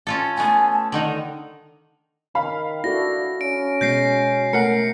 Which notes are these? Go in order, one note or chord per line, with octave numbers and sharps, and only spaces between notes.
C#4 F4 A4
A3 B3 G#5
A5
D3 D#3 D#4 F#5
D#3 F5 B5
D4 E4 F#4 A4 A#6
C#4 D7
B2 G#3 G6 A#6 C7
A3 A#4 F#5 C7 C#7